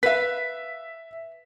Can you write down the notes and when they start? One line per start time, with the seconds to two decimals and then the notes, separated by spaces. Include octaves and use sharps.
0.03 B4 E5 F5 B6